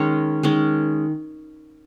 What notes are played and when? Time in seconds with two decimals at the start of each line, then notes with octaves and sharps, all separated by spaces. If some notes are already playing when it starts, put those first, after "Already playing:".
Already playing: D#3 G#3 C#4 G#4 A#4 C#5
0.43 D#3 G#3 C#4